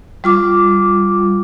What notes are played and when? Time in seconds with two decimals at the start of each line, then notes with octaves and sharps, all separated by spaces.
0.24 G3 F4 D6